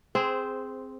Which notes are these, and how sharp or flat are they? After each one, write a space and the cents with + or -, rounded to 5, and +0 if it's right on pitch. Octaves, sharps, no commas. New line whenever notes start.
C4 +0 G#4 +0 C5 -15